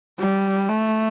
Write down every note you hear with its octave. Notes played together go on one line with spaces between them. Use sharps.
G3
A3